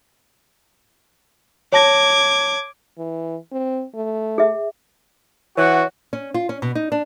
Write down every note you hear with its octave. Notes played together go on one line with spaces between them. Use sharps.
C#5 A5 D6 G#6 A#6
E3
C4
A3
G#4 E5
E3 F#4 C#5 F#5
C#4
F4
C#4
B2
D#4
D4